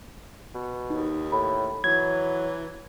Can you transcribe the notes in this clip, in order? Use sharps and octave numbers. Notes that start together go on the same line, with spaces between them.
B2
D#2 D#4
A2 B5
E3 F#3 G#6